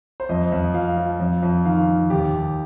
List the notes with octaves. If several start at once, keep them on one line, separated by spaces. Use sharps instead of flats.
C5
F2 D#5
F2
F3 F5
F3
F2
F2
D#3 F5
D#3
D#2 G4
D#2